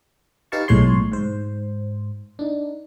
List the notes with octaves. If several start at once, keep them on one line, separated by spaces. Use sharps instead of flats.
D#4 G4 B4 F5 A5 C#6
B1 A2 G#3 C#5 C6
G#2 C5
D4 D#4